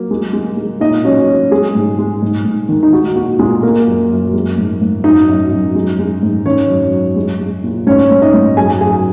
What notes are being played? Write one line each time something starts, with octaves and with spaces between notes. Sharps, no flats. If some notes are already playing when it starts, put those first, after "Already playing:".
Already playing: F#3 A#3
G#3
G#3
G#3
A#2 D#4 D#5
F#3 C#4 C#5
F#3
G#3 G#4
G#2
G#3
G#2
G#2
D#3
D#4
G#3 F#4
A#2 F#4
A#2 G#3 G#4
G#3 A#3 A#4
F#2
F#2
G#3
G#2
G#2
F#2 D#4 D#5
F#2
F#2
G#3
G#3
G#2
D#3 C#4 C#5
F#2
F#3
G#3
G#3
A#2
G#2 C#4 C#5
G#2
D#4 D#5
G#2
F#2 G#4 G#5
F#3 G#4 G#5